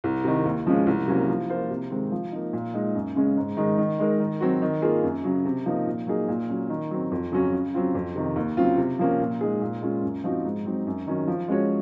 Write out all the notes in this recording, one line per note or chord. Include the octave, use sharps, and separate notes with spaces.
C2
C3 D#3
D#2
C#3 F3 G#3 C#4
C2
C3 F#3 A#3 C#4
F3
A#3 F4 C5
C3
D#3 G#3 C4
F3
A#3 D#4
A#2
G#3 D#4
F#2
C#3 G#3 C#4
G#2
D#3 G#3 D#4
D#3
G#3 D#4 A#4
D#3
F#3 C4 F#4
D#3
A#3 F4 G#4
F#2
C#3 F#3
C3
F3 A#3 D#4
A#2
F#3 A#3 D#4 G#4
A#2
F#3 C#4
D#3
F#3 C4
F2
C#3 F#3 C#4 F#4
C#3
F#3 C4 F4
F2
C3 D#3
D#2
C#3 F#3 C4 F4
C3
F3 A#3 C#4
A#2
G#3 D#4 G#4
A#2
G#3 C#4 F4
F#2
F3 C4 D#4 F#4
G#2
F#3 C4 D#4
F#2
D#3 F#3 C#4
F3
G#3 C#4 F#4 C#5